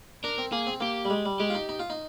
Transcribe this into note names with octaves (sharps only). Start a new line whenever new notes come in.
D4 A#4
C4
A#3 G#4
C4
A#3 G4
G3
G#3
G3
G#3 G4
F4
D#4
D#4
F4
D#4